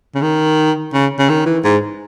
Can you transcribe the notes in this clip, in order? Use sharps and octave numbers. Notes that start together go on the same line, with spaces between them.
C#3
D#3
C#3
C#3
D#3
E3
G#2